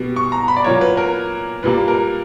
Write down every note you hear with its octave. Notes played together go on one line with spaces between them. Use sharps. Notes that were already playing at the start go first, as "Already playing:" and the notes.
Already playing: B2 G3 B3
C#6
A#5
B5
D5
A#2 F#3 A#3 C#5
B4
A#4
A#2 G3 A#3 B4
A#4